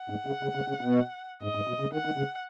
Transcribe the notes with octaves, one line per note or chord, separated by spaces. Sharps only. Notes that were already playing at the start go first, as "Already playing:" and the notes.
Already playing: F#5
G#2
C#3
C#3
C#3
C#3
B2
G#2 D#5
G#2
B2
C#3
D#3 F#5
D#3
C#3